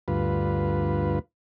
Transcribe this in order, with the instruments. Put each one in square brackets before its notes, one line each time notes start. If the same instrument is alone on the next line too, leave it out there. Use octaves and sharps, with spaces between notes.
[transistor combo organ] D2 G2 F4 B4